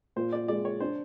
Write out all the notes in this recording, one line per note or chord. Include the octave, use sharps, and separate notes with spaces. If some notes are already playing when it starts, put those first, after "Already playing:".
A#2 C5
D5
G#3 D5
C#5
D4 C5